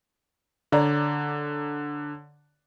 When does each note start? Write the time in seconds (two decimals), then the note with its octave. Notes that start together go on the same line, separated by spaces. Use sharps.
0.72 D3 C#5 D5 A#5